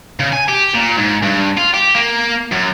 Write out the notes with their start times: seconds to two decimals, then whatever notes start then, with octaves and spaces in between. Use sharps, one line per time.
0.20 C#3
0.33 G#5
0.49 G4
0.74 A#2
0.98 G#2
1.23 G2
1.58 F4
1.74 G4
1.95 A#3
2.52 F#2